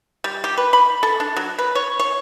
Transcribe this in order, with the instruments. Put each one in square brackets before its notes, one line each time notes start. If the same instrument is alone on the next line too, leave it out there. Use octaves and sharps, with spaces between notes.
[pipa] G3
G4
B4
B5
A4
D4
F#3
B4
C#5
C#5